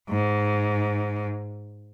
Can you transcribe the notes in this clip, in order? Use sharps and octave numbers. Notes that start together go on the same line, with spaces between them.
G#2